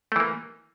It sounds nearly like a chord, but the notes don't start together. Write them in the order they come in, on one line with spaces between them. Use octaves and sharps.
A3 E3 A#3